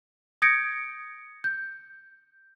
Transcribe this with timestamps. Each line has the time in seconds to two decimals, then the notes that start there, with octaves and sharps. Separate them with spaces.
0.42 D#6 G6 G#6 A#6 C#7 D7
1.44 G6